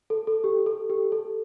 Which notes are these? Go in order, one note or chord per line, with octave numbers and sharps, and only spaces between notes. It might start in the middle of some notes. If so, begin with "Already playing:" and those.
A4
A4
G4
A4
G4
A4